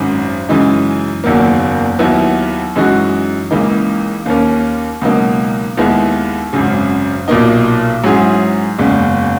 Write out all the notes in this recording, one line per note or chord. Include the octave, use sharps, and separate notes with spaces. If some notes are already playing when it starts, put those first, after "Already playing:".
Already playing: G#1 F#2 D#3
F#2 C#3 E3 G#3 D#4
F#1 E2 D#3 F#3 A#3
D#2 D#3 F#3 B3 E4
F#2 E3 G#3 D#4 F#4
C#2 C#3 E3 A#3 D#4
D#2 D#3 A#3 C#4
C#2 B2 F#3 A#3 D#4
D#2 D#3 G#3 B3 E4
G#1 F#2 C#3
B1 A#2 A#3 D#4
G#2 F#3 C#4 E4 G#4
F#1 E2 C#3 G#3